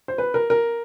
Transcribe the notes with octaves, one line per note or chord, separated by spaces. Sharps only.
C5
B4
A#4
A#4